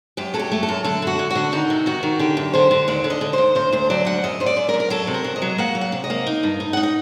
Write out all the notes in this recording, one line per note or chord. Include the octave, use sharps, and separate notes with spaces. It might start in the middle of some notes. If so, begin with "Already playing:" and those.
F#2 G4
F#3 A4
G4
A3
A4
F#2
D3 A4
D3 F#4
D3
D3 F#4
D#3 D#4
C3
D#3 F#4
D#3
D3 G4
F#2
D3 C5
D3
D#2 D5
D3
D#5
D3
D#2 C5
D2 C5
D2 C5
F#3 D5
D2 F#5
F#2 D#5
F#2 C5
D5
F#2
A#4
F#2
A#4
F#3 A4
C3
A#4
C3
D#5
F#3
A#3 F#5
F#3
F#5
C3
D#5
A#3
D#4
G2
D#4
D#4 F#5
D#5